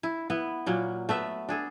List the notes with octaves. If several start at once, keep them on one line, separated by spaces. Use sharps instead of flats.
E4
B3 E4
A#2 F#3 A#3
A3 B3 E5
D4 G#4 A4